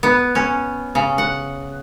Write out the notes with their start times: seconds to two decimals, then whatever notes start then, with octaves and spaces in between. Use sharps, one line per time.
0.03 B3
0.35 C#4
0.95 C#3
1.18 F#5